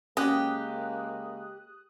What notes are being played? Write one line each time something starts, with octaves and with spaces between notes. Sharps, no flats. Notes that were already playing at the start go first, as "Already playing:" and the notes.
C#3 G#3 A#3 C#4 F#4 G4 D#6 F#6